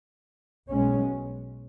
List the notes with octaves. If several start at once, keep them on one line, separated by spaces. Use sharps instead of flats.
B1 B2 G#3 C#4